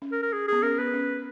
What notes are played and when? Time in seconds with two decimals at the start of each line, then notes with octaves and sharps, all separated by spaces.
0.02 C#4
0.12 A#4
0.22 A#4
0.33 G#4
0.48 B3 G#4
0.63 C#4 A#4
0.78 B3 B4
0.94 C#4